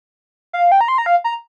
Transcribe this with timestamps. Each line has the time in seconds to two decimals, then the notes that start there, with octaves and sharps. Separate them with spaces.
0.53 F5
0.72 G5
0.81 A#5
0.88 C6
0.98 A#5
1.06 F5
1.24 A#5